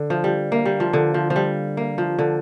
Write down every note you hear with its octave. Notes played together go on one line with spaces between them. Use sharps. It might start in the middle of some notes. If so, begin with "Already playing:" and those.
Already playing: D3
F3
G3
A#3
G3
F3
D3
F3
F3
G3
A#3
F3
D3